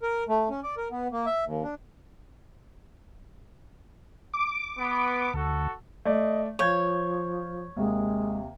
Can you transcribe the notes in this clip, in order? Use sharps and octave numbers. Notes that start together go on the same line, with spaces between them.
A#4
A3
C#4
D5
A#4
B3
A#3
E5
D#2
D4
D6
B3
D2 F#4 A4
A3 D5 D#5
F3 C#5 F5 G6 G#6
D#2 C3 G#3